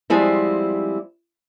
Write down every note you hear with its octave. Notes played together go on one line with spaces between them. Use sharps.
F3 G3 G#3 C4 E4